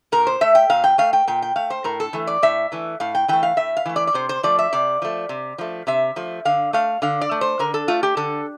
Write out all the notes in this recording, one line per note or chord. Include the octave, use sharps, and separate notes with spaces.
A#2 A#4
C5
A3 E5
G5
A#2 F5
G5
A3 F5
G5
A#2 G5
G5
A3 F5
C5
A2 A#4
A4
E3 A3
D5
A2 E5
E3 A3
A2 F5
G5
E3 A3 G5
F5
A2 E5
F5
E3 A3
D5
D5
C3 C5
C5
F3 A3 D5
E5
C3 D5
F3 A3
C3
F3 A3
C3 E5
F3 A3
D3 F5
A3 F5
D3 F5
D5
A3
C5
D3 A#4
A4
A3 F4
G4
D3 A4